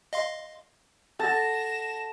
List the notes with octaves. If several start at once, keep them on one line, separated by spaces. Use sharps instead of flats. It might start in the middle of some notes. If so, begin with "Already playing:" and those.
D#5 F5 C6
A4 F#5 A5 A#6 E7